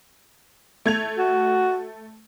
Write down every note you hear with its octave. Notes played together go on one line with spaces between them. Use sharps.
A3 G#6 F7
F#4